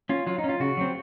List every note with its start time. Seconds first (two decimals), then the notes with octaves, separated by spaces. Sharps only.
0.09 C#4 F4
0.26 F#3 F4
0.38 D#4
0.44 C#4
0.49 F4
0.60 C#3 F#4
0.77 F#3 C4